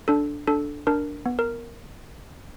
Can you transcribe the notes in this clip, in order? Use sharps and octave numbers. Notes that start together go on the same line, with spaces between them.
D4 A4
D4 A4
D4 A#4
B3
A#4